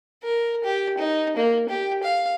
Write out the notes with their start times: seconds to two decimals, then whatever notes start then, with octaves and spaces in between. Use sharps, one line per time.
0.23 A#4
0.64 G4
0.98 D#4
1.37 A#3
1.69 G4
2.03 F5